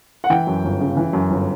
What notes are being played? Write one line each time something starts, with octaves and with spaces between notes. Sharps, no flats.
F#5
E3 G5
F#2
G1
C#3
E3
F#2
G1